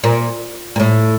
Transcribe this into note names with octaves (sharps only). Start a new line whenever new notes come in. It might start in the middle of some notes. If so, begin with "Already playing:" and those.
A#2
A#2
A2